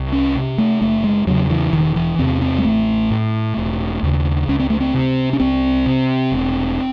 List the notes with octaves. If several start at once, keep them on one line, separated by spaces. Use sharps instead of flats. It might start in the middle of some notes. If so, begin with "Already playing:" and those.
Already playing: C2
C#4
C3
A3
F#1 A3
G#3
E2 C#3 F#3
E3
E1 D#3
E3
E2 C3 C4
C4
G#3
A1 A3
A2
E1
D#2 C#3
C#2 C#4
C4
A3
C4
C3
C#4
C2 C4
C3
E1